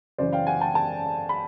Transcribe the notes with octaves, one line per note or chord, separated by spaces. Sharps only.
F#2 C#3 E3 C5 D5
F5 G5
F#5 G#5
G5 A5
G5 A5
B5